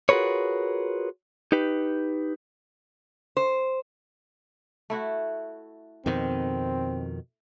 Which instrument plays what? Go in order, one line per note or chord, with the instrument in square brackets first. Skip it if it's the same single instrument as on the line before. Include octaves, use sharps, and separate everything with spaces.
[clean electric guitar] F4 F#4 G#4 A#4 B4 C#5
D#4 G4 B4
[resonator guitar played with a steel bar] C5
[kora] A3 E4 F#4
[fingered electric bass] F2 B2 D#3 [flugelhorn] C4